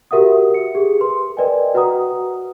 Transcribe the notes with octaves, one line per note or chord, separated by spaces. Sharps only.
F#4 G4 A#4 E5 F#5 D#6
C#7
G4 G#4
B4 C6
A#4 B4 D5 D#5 G5 G#5
F#4 B4 F#5 A#5 D#6